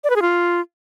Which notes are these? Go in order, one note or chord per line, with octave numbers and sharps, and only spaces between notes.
D5
B4
G#4
F4